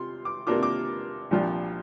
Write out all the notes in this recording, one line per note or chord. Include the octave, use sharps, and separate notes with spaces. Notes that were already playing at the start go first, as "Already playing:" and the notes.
Already playing: C3 F4 C6
D6
C3 A#3 D4 F4 D6
D6
C2 A#2 F3 D4 F4